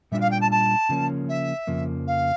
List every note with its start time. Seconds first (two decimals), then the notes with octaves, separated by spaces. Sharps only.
0.12 A#2 G3 D4 F4 E5
0.20 F5
0.31 G5
0.41 A5
0.51 A5
0.89 C#3 F3 A#3 C#4
1.29 E5
1.67 F2 C#3 F3 A#3
2.07 F5